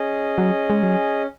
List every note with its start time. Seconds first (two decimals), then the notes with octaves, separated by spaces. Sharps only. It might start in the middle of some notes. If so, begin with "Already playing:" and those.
Already playing: C#4 G#4 D#5
0.38 F#3
0.70 G#3
0.83 F#3